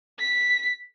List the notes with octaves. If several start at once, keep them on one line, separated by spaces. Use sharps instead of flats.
B6